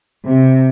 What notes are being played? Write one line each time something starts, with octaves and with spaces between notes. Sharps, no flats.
C3